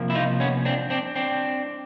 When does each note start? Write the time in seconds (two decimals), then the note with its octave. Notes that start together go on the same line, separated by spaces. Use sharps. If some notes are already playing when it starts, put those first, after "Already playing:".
Already playing: C3 F3 A#3
0.10 E4
0.15 D#4 F4
0.40 B3 C#4
0.65 C4 D4
0.90 C4 D4
1.16 C4 D4